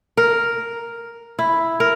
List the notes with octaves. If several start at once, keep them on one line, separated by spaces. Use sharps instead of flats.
A#4
E4
A#4